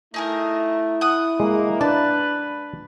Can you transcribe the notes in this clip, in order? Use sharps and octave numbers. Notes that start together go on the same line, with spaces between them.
A3 D#4 E4 G#4 A#4
F#5 D#6
G#3 A#3
D4 B4 A5